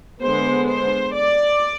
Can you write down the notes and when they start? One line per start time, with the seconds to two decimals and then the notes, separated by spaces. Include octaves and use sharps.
0.21 D3 G#3 B3 C5
0.68 C5
1.15 D5